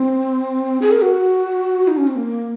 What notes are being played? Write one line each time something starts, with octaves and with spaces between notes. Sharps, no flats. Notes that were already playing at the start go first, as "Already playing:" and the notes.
Already playing: C4
G#4
A#4
F#4
D#4
C#4
C4
A#3